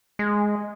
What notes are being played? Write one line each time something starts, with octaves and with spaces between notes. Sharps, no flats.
G#3